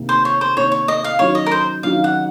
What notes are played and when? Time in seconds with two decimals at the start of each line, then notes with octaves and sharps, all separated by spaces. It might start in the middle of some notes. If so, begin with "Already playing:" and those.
Already playing: C3 D#3 A#3
0.09 C5
0.25 C#5
0.41 C5
0.57 C3 D#3 A#3 C#5
0.72 C#5
0.88 D#5
1.04 F5
1.19 D#3 F#3 C#4 C#5
1.35 D#5
1.46 A#4
1.52 C5
1.83 D#3 F#3 C#4 F5
2.04 F#5